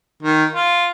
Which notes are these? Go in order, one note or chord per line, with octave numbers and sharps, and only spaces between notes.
D#3
F4